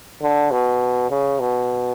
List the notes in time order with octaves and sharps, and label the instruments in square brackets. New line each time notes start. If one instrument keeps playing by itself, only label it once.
[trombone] D3
B2
C#3
B2